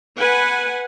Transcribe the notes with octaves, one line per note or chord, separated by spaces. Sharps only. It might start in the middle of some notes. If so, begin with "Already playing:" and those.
B4 F#5 G#5